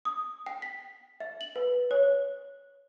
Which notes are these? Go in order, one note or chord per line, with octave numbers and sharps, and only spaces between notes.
D#6
G5
B6
E5
F#7
B4
C#5